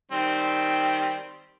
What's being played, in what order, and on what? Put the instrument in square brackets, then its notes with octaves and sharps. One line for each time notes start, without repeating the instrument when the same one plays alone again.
[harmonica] D#3 G3 C4